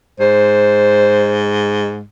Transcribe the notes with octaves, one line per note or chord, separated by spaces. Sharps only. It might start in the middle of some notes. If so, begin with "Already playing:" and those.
G#2 C5